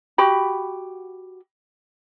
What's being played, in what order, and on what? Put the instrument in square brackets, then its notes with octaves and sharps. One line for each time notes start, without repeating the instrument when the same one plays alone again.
[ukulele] F#4 G4 B5